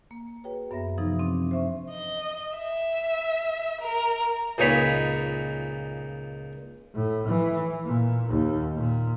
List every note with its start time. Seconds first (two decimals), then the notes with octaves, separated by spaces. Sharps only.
0.11 A#3
0.44 F#4 G#4 B4 C#5 G5
0.71 F#2 B3 C#5 E5 A#6
0.98 C3 E3 F3 D#4
1.19 C4 D4
1.51 C5 E5 C#6
1.91 D#5
2.57 E5
3.81 A#4
4.58 C#2 A#2 D#4 C#5 B5
6.95 A2
7.27 E3
7.85 A#2
8.28 D#2
8.76 A#2